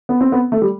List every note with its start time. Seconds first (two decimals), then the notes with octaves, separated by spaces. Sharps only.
0.09 B3
0.21 C4
0.32 B3
0.52 A3
0.62 G3